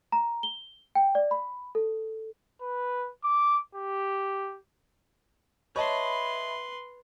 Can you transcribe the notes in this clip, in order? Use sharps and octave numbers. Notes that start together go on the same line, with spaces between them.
A#5
G7
G5
D5
B5
A4
B4
D6
G4
B4 C#5 D#5 E5 A5 B5 C6